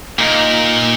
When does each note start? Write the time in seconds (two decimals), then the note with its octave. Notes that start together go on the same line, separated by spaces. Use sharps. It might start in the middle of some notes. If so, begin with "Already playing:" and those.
0.18 A#2 A#3 D#4 A#4